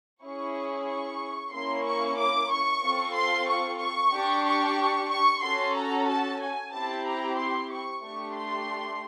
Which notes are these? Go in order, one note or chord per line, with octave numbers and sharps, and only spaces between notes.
C#4 E4 G#4 C#6
C#6
A#3 C#4 E4 C6
C#6
D6
C#6
C4 F4 A4
C6
C#6
C#6
D4 G4
C#6
C#6
C#4 F#4 A4 C6
A#5
A5
G#5
C4 E4 G4 A5
A#5
C6
C#6
A3 D4 G4 C#6
C6